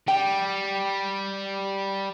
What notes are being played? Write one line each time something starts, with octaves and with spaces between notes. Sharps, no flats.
G3 G5